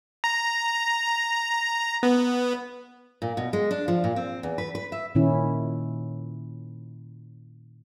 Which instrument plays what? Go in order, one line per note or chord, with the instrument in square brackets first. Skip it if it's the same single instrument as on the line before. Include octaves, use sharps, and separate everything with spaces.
[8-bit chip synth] A#5
B3
[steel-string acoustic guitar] A#2
B2
G#3
D4
F3
A#2
C4
E2
B4
B4
E5
[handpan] A#2 D#3 C#4 E4